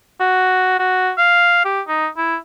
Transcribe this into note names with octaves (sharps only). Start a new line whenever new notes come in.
F#4
F#4
F5
G4
D#4
E4